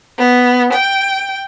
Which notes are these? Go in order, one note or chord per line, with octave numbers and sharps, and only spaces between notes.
B3
G5